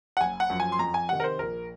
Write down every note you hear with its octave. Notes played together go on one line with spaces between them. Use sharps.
F#5
F#1 G#5
F#5
F#2 F3
G#5
C6
F2 A#5
G#5
C3 D#3 F#5
A#4
C5
A#1 A#4